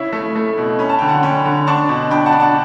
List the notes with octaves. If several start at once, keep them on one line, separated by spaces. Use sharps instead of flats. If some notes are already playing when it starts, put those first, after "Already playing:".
Already playing: C#3 E4 C#5 E5
A3
A3
B2
C#4 B5
A5
D3 G5
F#5 A5
C#4 G5 B5
D3
D4 A5 C#6
B2
D4 G5 B5
F#5 A5
D4
F#5 A5